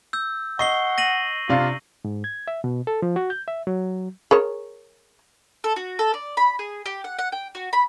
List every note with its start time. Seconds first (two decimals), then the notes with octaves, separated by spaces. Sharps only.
0.13 E6 G6
0.59 D#5 F#5 C#6 C7 G7
0.98 A#6 D#7 F#7
1.49 C3 D4 F4 F5
2.05 G#2
2.24 G#6
2.48 E5
2.64 B2
2.87 A4
3.02 F3
3.16 F#4
3.30 G6
3.48 E5
3.67 F#3
4.31 G#4 A#4 C#5
5.64 A4
5.76 F#4
5.99 A4
6.14 D5
6.37 B5
6.59 G#4
6.86 G4
7.04 F#5
7.19 F#5
7.32 G5
7.55 F#4
7.73 B5